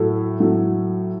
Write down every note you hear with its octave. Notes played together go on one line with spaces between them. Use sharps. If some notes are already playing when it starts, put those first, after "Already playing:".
Already playing: A2 F#3 A4
A2 F#3